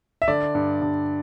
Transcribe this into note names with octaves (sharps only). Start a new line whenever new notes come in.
E5
D3 D5
G2
G2